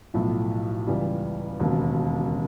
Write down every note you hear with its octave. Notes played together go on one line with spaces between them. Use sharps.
B1 A2 F3
C#2 C#3 E3 G3
E1 D#2 C#3 F#3